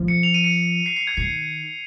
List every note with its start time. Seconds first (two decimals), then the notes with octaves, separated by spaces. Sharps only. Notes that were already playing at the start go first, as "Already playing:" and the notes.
Already playing: F3
0.08 C#7
0.23 F7
0.34 D#7
0.44 C#7
0.86 C7
0.96 C7
1.07 G#6
1.17 D#3 C7